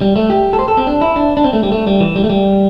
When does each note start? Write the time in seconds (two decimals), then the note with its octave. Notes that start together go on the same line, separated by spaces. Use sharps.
0.01 G3
0.16 A3
0.30 G4
0.53 A4
0.59 C5
0.68 A4
0.77 C4
0.87 D4
1.01 E4
1.16 D4
1.37 D4
1.44 C4
1.53 A3
1.63 G3
1.72 A3
1.87 G3
2.00 E3
2.16 G3
2.24 A3
2.30 G3